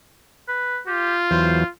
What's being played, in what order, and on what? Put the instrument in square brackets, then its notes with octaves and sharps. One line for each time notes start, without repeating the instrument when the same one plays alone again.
[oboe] B4
[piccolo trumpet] F4 [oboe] G4
[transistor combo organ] E2 E3 F#3 [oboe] C5